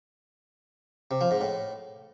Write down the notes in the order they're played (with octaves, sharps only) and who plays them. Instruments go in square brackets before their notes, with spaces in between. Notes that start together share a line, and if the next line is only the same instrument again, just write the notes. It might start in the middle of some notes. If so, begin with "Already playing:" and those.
[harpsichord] C3
F3
G#2
A2